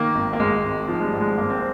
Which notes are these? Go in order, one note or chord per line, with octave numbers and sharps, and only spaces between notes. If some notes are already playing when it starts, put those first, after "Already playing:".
Already playing: D#3 A#3
G#1
A#3
G#1 G#3
G#1
D#3 F3
G#3
G3
G#2
G#3
G#1 A#3
C4